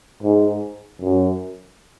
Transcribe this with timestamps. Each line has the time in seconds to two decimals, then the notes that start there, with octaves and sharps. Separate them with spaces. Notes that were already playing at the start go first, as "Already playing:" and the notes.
0.23 G#2
1.01 F#2